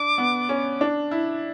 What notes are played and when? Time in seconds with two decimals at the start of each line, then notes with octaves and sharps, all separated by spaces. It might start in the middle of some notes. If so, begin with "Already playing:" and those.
Already playing: D4 D6
0.18 B3
0.49 C#4
0.81 D4
1.11 E4